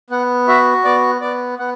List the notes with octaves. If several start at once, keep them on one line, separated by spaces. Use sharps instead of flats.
B3 F#5
F#4 E5
B3 D5
B3 D5
B3 F#5